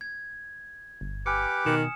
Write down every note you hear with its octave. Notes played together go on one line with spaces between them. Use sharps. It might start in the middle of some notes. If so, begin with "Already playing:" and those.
G#6
G1
G4 B4 G#5 D6 F6 C#7
B2 D#3 D#6 C#7 E7